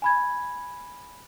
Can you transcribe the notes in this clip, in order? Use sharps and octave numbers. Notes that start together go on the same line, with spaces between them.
G#5 B5 G#6